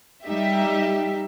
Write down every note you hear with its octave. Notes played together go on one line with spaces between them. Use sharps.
G3 D#4 G4 E5